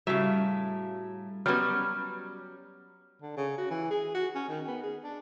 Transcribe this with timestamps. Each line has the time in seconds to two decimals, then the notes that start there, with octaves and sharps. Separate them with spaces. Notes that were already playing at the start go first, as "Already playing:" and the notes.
0.07 A2 C#3 G3 F#4 E5 F5 A#5
1.46 F#3 G3 B3 C#4 A#5 F6
3.22 D3
3.37 C#3
3.58 F#4
3.71 E3
3.91 G#4
4.14 F#4
4.35 C#4
4.49 D#3
4.68 B3
4.83 G#4
5.04 D4